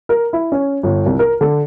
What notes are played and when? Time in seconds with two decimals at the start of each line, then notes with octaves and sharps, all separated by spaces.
0.09 A#4
0.33 E4
0.52 C#4
0.83 G1
1.06 C2
1.19 A#4
1.41 D3